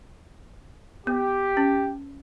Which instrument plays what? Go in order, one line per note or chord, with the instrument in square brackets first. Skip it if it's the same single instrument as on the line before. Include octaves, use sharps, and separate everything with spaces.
[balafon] B3 [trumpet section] G4
[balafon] C#4